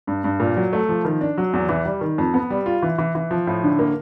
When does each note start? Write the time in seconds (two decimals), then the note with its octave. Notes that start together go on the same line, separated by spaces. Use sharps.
0.07 G2
0.24 G2
0.40 A#2
0.57 F#3
0.73 A3
0.89 F3
1.05 D#3
1.21 D4
1.38 F#3
1.53 E2
1.69 E3
1.85 G3
2.01 D#3
2.18 F2
2.34 B3
2.50 G3
2.66 F4
2.82 E3
2.98 E3
3.15 E3
3.31 F3
3.47 A2
3.64 D3
3.79 A#3